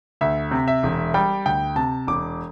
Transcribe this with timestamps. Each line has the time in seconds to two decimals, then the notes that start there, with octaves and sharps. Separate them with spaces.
0.21 D2 E5
0.51 C3
0.68 E5
0.83 E1
1.14 G3 G5
1.45 D2 G5
1.76 C3 A5
2.07 E1 D6